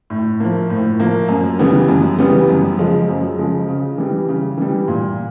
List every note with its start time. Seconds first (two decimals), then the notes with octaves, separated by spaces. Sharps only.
0.10 A2
0.40 F3 A#3
0.70 A2
1.00 F3 A#3
1.29 F#2
1.59 C#3 E3 G3 B3
1.88 F#2
2.18 C#3 E3 G3 B3
2.49 F#2
2.78 C#3 F3 G#3
3.09 F#2
3.38 C#3 F3 G#3
3.68 C#3
3.98 E3 G3
4.28 C#3
4.57 E3 G3
4.88 A#2